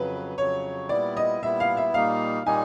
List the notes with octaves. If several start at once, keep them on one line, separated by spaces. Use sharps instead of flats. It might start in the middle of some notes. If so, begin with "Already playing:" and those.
Already playing: F2 C#3 F#3 B4
F2 C#3 F#3 C#5
A#2 G3 B3 E4 D5
D#5
A#2 G3 B3 E4 E5
F5
E5
A#2 G3 A#3 D#4 F5
A#2 G3 A#3 D#4 G#5